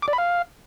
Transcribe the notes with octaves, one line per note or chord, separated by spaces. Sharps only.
D6
D5
B5
F5